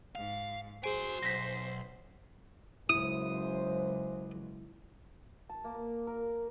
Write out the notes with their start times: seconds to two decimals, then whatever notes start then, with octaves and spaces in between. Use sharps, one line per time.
0.15 G#2 F5
0.84 F#4 G#4 C5 G#5 D7
1.22 B1 A#6 B6
2.89 C#2 F#2 C#3 F#3 E4 C5 D#6
5.49 A5
5.64 A#3
6.07 A#4